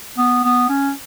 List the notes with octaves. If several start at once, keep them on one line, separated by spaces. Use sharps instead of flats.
B3
B3
C#4